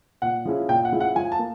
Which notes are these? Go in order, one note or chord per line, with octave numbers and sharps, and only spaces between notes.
A#2 F#5
F3 G#3 C#4 E4
A#2 G5
F#5
F3 G#3 C#4 E4
F#5
F3 G#5
A5
A#3